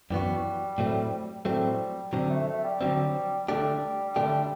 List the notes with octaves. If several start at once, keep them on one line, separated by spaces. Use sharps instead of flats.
F#2 E3 G3 B3 F#4
A2 F#3 A3 C4
A2 F#3 G3 A3 C4
D3 F#3 G3 C4
A3
A3
G3
D3 F#3 G3 C4
D3 G3 A3 D4 G4
D3 A3 D4 G4